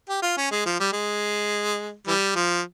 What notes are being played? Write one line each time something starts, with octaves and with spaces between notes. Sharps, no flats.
G4
F4
C#4
G#3
F3
G3
G#3
E3 G3
F3